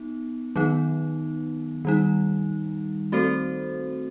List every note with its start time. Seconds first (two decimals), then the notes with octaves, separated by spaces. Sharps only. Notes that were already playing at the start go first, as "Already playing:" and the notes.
Already playing: B3 D#4
0.56 D#3 F#3 B3 D#4
1.85 D#3 G3 D#4
3.12 A3 C4 F#4 A4 C5